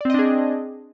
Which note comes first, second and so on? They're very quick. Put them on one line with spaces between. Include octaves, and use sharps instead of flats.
D5 C4 D#5 D4 G#4